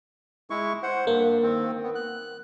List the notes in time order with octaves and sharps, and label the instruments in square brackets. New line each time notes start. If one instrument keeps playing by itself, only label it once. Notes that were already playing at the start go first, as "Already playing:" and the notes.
[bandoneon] G#3 E4 C#6
C5 F#5
[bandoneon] G2 [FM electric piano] A#3
[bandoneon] D#3 C4
B3
F#6